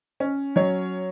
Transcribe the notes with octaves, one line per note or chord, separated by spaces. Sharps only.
C#4
F#3 C#5